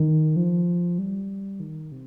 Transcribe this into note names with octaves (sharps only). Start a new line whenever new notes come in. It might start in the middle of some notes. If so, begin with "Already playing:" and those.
Already playing: D#3
F3
G3
D#3
C3